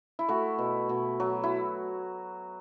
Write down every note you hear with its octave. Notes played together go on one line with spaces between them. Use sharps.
E4
A3 F#4
B2
B2
F#3
E4